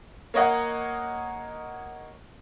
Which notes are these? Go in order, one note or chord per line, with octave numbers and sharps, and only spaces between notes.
A#3 C#5 D#5 F#5